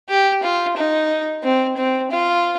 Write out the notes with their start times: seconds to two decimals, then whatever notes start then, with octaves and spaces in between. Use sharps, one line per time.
0.09 G4
0.43 F4
0.77 D#4
1.43 C4
1.77 C4
2.11 F4